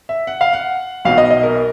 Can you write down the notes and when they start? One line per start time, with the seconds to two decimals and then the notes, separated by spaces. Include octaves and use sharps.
0.09 E5
0.27 F#5
0.41 F5
0.53 F#5
1.05 B1 B2 F#3 F5
1.18 D#5
1.31 D#5
1.43 A#4